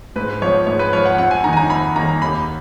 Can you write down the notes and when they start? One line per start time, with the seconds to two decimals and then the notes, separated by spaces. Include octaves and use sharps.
0.16 G#2 B4
0.42 F3 B3 C#5
0.67 G#2 C#5
0.79 B4
0.93 F3 B3 C#5
1.05 F#5
1.18 F2 F#5
1.31 G#5
1.44 D#3 A#3 D#4 A#5
1.53 G#5
1.57 A#5
1.70 F2 B5
1.95 D#3 A#3 D#4 A#5
2.22 D#2 B5